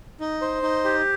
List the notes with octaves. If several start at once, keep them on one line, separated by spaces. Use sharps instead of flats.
D#4
C5
D#4
G4